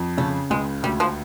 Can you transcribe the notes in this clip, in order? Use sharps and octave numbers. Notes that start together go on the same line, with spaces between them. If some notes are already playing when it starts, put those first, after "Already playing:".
Already playing: F2
C#3 A3
C#2 G#3
D2 G3
F3